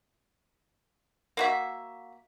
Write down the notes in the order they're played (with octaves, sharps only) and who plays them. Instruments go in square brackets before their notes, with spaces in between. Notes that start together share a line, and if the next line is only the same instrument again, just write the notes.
[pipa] A#3 F#4 E5